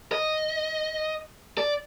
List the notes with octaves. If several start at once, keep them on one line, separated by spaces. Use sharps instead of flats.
D#5
D5